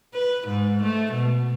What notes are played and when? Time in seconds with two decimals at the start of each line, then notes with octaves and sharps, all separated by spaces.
0.14 B4
0.48 G#2
0.83 A3
1.13 B2